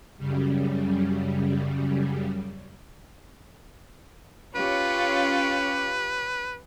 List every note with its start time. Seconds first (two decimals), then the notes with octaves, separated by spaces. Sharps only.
0.18 F#2 C#3 G3
4.55 C#4 F4 G4 B4 C#5